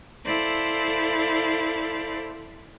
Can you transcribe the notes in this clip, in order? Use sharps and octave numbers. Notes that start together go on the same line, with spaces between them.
E4 A4 C5 D5 F5